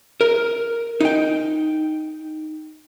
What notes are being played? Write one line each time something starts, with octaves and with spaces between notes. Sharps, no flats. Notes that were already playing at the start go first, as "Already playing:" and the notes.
A#4
D#4 G5